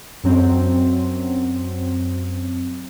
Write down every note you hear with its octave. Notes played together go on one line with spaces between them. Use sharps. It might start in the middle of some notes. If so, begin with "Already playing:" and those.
F#2 F#3 C4